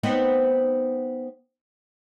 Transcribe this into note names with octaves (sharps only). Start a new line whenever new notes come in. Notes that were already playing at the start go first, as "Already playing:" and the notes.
B3 C4 D#4